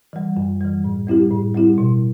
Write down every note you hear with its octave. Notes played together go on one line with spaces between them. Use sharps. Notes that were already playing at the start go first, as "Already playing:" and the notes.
E3 G3
F#2
E3 G3
A2
G3 C4 E4 G4
A2
G3 C4 E4 G4
B2